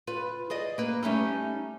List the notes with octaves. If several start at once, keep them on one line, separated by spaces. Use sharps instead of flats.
F4 B4
G#4 D5 D#5
A#3 B4
G3 A3 C#4 D#4